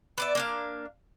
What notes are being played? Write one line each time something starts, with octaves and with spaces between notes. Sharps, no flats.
B3 D5 E5
A#3 D4 F5